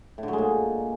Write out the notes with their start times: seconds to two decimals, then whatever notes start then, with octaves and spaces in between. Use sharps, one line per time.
0.18 A2
0.23 D3
0.28 F#3
0.33 G#3
0.38 A#2